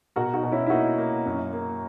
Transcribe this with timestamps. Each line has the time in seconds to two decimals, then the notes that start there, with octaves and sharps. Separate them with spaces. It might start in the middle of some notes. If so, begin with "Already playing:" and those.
0.16 B2 F#4 A#4
0.33 D#4 F#4
0.43 B2
0.52 C#4 E4
0.66 E4
0.70 A#3 D#4 F#4
0.98 A#3
1.26 F#2
1.53 A#3